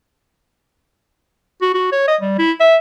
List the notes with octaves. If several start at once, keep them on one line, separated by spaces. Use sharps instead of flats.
F#4
F#4
C#5
D#5
G3
E4
E5